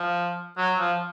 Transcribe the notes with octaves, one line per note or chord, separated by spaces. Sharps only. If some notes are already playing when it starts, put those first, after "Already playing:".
Already playing: F3
F#3
F3